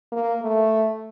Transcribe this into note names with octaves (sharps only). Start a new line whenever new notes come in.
A#3
A3